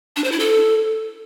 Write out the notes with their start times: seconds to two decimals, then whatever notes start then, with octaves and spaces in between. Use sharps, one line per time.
0.16 D4
0.24 C5
0.32 E4
0.40 A4